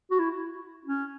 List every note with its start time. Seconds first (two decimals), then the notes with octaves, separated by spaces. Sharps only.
0.11 F#4
0.19 E4
0.85 C#4